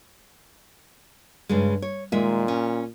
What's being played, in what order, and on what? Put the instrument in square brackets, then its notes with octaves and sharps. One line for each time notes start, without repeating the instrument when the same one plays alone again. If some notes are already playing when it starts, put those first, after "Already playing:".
[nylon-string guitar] G2 C#3 G#3
C#5
[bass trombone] A#2 [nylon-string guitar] D#3 G#3 E5
[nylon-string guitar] C#4